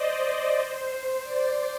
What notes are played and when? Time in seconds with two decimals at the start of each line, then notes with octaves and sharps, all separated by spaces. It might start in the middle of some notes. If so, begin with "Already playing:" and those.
Already playing: C5 D5 D#5
0.23 D5
0.56 C5
1.23 D5